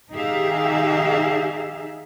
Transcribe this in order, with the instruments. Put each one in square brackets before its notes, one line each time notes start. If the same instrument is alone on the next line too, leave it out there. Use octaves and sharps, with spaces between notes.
[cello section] D#3 D#4 G4 G#4 E5 F5